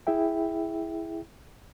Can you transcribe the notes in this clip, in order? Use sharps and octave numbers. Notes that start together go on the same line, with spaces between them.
E4 G#4 E5 G5